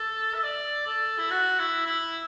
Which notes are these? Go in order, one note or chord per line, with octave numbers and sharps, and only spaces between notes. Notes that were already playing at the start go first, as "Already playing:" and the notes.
Already playing: A4
E5
D5
A4
E4
F#4
E4
E4